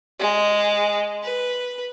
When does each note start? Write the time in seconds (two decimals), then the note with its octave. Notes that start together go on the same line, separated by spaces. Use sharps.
0.19 G#3
1.23 B4